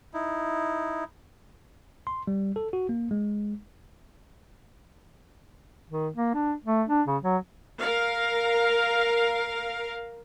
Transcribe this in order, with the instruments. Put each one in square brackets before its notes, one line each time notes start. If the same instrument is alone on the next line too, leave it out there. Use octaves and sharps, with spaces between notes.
[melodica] D#4 E4
[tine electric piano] C6
G3
A4
F#4
A#3
G#3
[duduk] D#3
A#3
D4
A3
D4
C#3
F#3
[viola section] A#4 F5